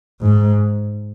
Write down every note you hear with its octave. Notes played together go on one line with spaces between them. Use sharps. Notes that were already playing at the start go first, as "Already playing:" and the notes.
G#2